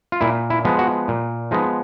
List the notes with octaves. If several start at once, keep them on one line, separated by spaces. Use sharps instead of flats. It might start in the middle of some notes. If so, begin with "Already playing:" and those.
F4
A#2 E4
E4
F3 G#3 B3
F#4
A#2
F3 G#3 B3 D#4